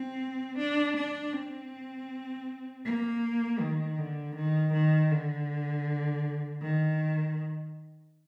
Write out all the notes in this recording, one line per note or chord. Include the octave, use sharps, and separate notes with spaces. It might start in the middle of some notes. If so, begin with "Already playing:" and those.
Already playing: C4
D4
D4
C4
A#3
D#3
D3
D#3
D#3
D3
D#3